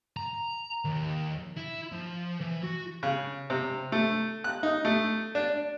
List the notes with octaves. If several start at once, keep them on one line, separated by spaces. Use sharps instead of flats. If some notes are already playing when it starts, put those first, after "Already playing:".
A#5
D#2
E4
F3
E3
F#4
C#3
C3
A3
F#6
D#4
A3
D4